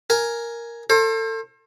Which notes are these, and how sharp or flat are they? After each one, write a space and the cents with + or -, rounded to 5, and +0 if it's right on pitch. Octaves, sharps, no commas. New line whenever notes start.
A#4 +0 G#5 +5
A4 +30 C5 +35